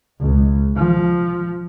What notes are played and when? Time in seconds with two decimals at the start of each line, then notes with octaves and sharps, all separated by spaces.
0.20 C#2
0.76 F3